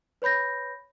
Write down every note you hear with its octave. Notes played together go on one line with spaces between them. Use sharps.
B4 C#5 B5 G6 A#6